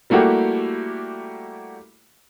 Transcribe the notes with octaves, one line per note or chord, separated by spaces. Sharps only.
G3 A3 A#3 E4 F#4 G4